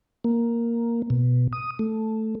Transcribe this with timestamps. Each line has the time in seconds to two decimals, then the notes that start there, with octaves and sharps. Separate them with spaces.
0.24 A#3
1.10 B2
1.53 D#6
1.79 A3